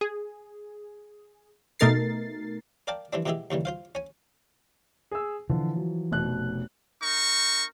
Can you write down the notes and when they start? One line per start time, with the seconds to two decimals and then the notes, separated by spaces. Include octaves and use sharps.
0.01 G#4
1.79 B2 A3 D#4 A#4 A6 C7
2.87 A#4 D5 F5 G5 A5
3.13 E3 G3 C4 D4
3.26 B2 E3 G#3 G4 G#4 E5
3.51 D#2 C#3 E3 G3
3.65 F4 C5 F5
3.95 C#4 G#5
5.11 G#4 E6
5.50 D3 E3 F3
5.76 F#3
6.11 F1 B2 F#6
7.02 C4 D#4 A#4 C#6